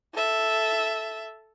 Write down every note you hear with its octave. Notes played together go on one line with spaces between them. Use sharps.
A4 E5